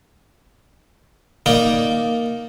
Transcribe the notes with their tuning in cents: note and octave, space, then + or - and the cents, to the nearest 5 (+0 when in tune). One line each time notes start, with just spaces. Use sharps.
A#3 +0 D#4 +0 D5 +0